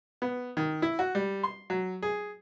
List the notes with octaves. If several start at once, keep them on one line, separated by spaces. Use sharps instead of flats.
B3
D#3
E4
F#4
G3
C6
F#3
G#4